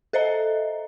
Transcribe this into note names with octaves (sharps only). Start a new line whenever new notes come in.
A4 C5 D#5 E5 A#5